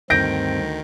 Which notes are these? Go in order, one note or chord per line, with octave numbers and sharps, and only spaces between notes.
D2 G2 D#3 C4 G6 A#6 D7